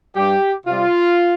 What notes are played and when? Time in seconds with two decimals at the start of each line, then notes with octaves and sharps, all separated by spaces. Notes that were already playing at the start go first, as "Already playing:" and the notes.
0.16 G2 G3 G4
0.67 C3 G3 F4